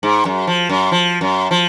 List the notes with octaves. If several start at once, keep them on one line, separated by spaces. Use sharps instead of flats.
G#2
F#2
F3
F#2
F3
F#2
F3